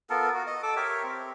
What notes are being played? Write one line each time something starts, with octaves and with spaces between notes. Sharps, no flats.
B3 F4 A4 A#4
F#4
D#5
A4 D6 E6
G4 A#4 C#5 E5
C4